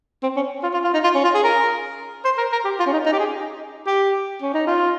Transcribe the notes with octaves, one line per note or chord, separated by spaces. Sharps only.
C4
C#4
F4
F4
F4
D#4
F4
C#4
F4
G#4
A#4
C5
A#4
A#4
G4
F4
C#4
D#4
D#4
G4
G#4
G4
C#4
D#4
F4